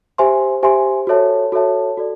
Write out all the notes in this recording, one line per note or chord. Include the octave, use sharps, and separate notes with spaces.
G4 C5 E5 G#5 C6
G4 C5 E5 G#5 C6
F#4 A4 C#5 E5 A5
F#4 A4 C#5 E5 A5
F#4 A4 D5